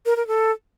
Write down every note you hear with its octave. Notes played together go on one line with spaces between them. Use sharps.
A#4
A#4
A4